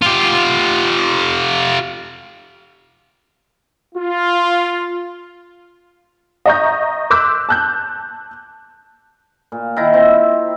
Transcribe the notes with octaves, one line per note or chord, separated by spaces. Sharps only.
F4 G4
F4
D#5 E5 A#5 C#6 G6
C6 D6 E6 F#6 G6 B6
A5 F#6 G6
A#2
D#3 E4 A#5
C4 E5
E5